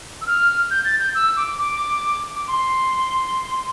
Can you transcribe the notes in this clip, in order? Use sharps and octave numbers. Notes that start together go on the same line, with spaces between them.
E6
F6
G6
A6
G6
E6
D6
D6
D6
C6